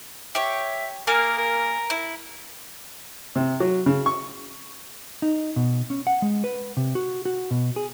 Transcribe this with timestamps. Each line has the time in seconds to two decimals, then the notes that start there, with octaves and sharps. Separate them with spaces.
0.35 G4 C#5 E5
1.07 A#3 G#4 A#4 F5
1.38 A#4
1.90 E4
3.35 C3
3.60 F#3
3.86 C#3
4.06 C#6
5.22 D#4
5.56 B2
5.90 C#4
6.07 F#5
6.22 G#3
6.44 B4
6.77 C3
6.95 F#4
7.25 F#4
7.51 B2
7.76 G#4